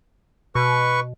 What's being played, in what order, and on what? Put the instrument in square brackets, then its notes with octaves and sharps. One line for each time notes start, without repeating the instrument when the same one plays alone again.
[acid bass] B2 [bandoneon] B4 C#6